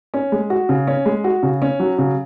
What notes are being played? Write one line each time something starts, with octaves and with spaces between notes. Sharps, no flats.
C#4
G#3
F#4
C#3
C#4
G#3
F#4
C#3
C#4
F#3
C#3